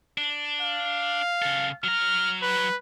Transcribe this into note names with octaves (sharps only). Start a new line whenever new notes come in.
D4
F5
C#3 A4
F#3 A#5 F6
B4